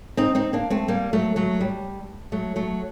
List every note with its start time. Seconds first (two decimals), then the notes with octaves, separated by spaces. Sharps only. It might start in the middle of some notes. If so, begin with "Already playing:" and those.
0.17 C4 D#4
0.35 C4 D#4
0.53 A#3 D4
0.70 A3 C4
0.88 G3 A#3
1.13 F#3 A3
1.36 F#3 A3
1.61 G3
2.32 F#3 A3
2.56 F#3 A3